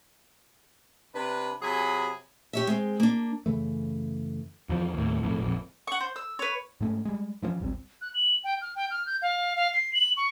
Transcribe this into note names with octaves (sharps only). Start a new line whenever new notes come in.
C3 D4 B4
C3 F#3 G#4 G#5 B5
G4 C#5 E5
G#3 C4
A#3 D4
F#2 C#3 E3 A3
F2 E3 F3
D#2 A2
B1 F2 A2
A#1 F2
F#5 C#6
C5
E6
B4 C#5
G#2 G#3 A3 C#4
G3 G#3
E3 F3 A#3 C#4
G#1 C#2 G3 C4
F#6
F#7
G5
F6
G5
F6
G6
F5
F5
C7
F#7
C#6